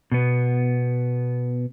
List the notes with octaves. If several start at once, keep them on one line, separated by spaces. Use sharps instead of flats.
B2 B3